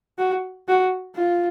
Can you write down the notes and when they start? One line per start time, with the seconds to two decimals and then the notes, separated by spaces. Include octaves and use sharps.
0.18 F#4
0.68 F#4
1.16 F4